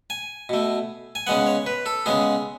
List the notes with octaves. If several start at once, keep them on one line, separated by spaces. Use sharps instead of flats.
G#5
B2 A3
G#5
C#3 G#3 B3 F#5
C#5
B4
A4
C#3 G#3 B3 G#4